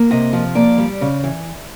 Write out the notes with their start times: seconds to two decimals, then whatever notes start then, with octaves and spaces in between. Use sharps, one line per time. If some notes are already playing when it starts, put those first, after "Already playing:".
Already playing: A#3
0.11 C3 D#5
0.33 F3
0.55 A#3 D5
0.78 G3
1.01 C#3
1.24 E3